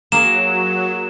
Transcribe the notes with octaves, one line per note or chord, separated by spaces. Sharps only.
F#3 A#3 G#4 A#4 E7